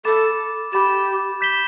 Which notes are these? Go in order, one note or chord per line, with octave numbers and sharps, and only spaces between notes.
A4 B5 D6 A6 E7
G4 B5 D6 A6 E7
G6 B6 E7 G7